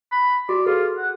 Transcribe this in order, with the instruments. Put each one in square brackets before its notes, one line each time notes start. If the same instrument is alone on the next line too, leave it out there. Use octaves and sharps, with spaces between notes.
[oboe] B5
[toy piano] F#4 [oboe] D5
[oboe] F4 [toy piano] G#4 A4 B4
[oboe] F#5